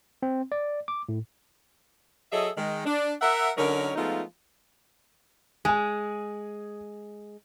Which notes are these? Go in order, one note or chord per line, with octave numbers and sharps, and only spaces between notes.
C4
D5
D6
A2
F#3 G#4 A4 D#5 E5
D#3 G#3
D4
A#4 E5 F#5
D3 F#3 C#4 D#4 A#4
F3 G#3 A3 B3 D#4 F4
G#3 G#4 G#5